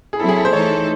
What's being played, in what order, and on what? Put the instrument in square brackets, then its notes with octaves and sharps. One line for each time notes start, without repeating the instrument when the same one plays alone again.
[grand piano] G#4
[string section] F#3 C4 E4 [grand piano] A4
[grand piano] G#4
A4
C5
[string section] E3 A3 D#4 A4 [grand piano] C#5